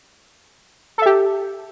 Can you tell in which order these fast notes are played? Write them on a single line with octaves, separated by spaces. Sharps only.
A4 E5 G4